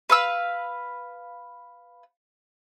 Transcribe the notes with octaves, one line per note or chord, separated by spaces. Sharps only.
B4 F5 E6